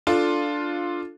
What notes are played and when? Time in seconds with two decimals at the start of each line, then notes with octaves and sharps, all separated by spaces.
0.07 D4 F4 A4